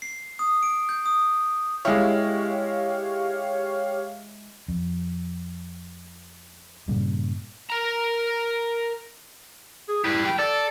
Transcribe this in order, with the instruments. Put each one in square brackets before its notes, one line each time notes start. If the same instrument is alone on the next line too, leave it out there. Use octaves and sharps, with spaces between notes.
[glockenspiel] C7
D#6
D7
G6
D#6
[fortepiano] G#3 E4 [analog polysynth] G4 C#5 F5
[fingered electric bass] F2
G2 A#2 C#3 G3
[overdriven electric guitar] A#4 A#5
[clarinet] G#4
[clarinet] E4 [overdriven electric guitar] G4 B4
[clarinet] G5
[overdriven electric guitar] A4 [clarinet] D5